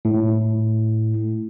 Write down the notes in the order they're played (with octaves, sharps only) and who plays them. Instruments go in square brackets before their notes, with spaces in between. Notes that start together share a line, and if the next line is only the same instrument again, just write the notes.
[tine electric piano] A2